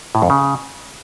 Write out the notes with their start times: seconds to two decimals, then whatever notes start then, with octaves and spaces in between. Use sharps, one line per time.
0.15 A2
0.22 F2
0.30 C#3